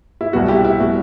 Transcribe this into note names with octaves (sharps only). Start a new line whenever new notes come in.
E4
C2 B2 G3 B3 F#4
E4 G4
E4
B2 G3 B3 F#4